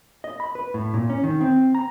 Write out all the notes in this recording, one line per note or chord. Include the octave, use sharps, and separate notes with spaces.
D#5
B5
B4
A2
A#2
C#4
D#3
C4
A#5